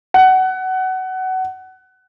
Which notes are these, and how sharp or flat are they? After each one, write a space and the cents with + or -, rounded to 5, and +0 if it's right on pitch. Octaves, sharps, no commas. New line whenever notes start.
F#5 +20